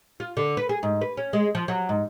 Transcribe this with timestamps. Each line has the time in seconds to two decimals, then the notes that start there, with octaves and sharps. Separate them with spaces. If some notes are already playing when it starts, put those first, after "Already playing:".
0.20 F4
0.37 D3
0.57 B4
0.69 G#4
0.83 G#2
1.01 B4
1.17 C#4
1.33 G#3
1.55 F3
1.68 F#3
1.89 G#2